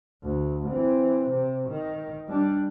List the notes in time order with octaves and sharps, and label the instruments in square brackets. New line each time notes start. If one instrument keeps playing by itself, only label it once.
[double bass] D2
E3 C4
C3
D#3
G3 D4